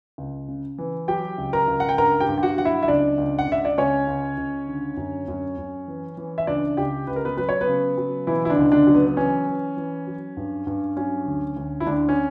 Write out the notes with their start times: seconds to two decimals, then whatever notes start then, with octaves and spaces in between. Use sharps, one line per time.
0.18 C#2
0.48 C#3
0.78 E3
1.08 F#3 G4 G5
1.38 C#2
1.53 A#4 A#5
1.68 C#2
1.80 F#5
1.89 G5
1.98 G2 A#4 A#5
2.20 G4 G5
2.29 G2
2.38 G5
2.43 F#4 F#5
2.58 F#3 F#5
2.65 E4 E5
2.83 E5
2.88 C#2 D4 D5
3.18 C#2
3.39 F#5
3.47 C#2 E5
3.65 D5
3.78 C#2 C#4 C#5
4.08 C#2
4.38 C#2
4.67 D3
4.97 F#2
5.28 F#2
5.58 F#2
5.88 E3
6.17 E3
6.38 E5
6.47 C#2 D4 D5
6.77 C#2 G4 G5
7.07 C#2 B4
7.16 A#4
7.25 B3 B4
7.37 F#3 B4
7.49 C#5
7.61 B3 B4
7.67 C#3
7.97 F#3
8.27 B2 E3 E4
8.45 E4
8.49 D3 D4
8.57 C#2
8.72 D3 D4
8.87 F#3
8.95 B3
9.07 B3
9.17 E3 C#4
9.47 E3
9.77 E3
10.07 F#3
10.37 G2
10.67 G2
10.97 F#3 C#4
11.26 D2
11.56 D2
11.80 E4
11.87 D2 D3 D4
12.09 C#4